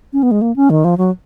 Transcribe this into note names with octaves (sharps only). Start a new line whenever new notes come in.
C#4
B3
G#3
A#3
C#4
D#3
F3
F#3